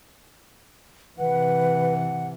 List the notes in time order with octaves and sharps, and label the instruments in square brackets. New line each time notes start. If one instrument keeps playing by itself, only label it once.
[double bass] C3 E3 [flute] B4 [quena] F#5